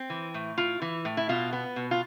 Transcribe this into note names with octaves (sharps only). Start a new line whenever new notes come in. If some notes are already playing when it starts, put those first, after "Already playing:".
Already playing: C4
E3
A2
E4 F4
E3
A2
E4
B2 F4
B3
B2
F4